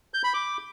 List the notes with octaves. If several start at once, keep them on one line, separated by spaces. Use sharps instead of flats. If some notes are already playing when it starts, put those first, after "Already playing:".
G6
B5
D6